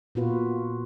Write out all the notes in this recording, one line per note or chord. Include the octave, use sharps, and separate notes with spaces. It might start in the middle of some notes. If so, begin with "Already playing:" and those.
A#2 B3 F4 F#4 B4